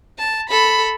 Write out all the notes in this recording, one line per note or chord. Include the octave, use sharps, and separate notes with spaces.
A5
A4 B5